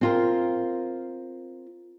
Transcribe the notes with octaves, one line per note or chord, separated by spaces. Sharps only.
C4 F4 A#4